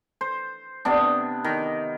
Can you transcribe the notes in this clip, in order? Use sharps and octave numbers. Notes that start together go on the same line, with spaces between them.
C5
C3 B3 D4
D#3